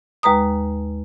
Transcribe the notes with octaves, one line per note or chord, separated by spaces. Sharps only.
D#2 G#3 B4 A#5 D#6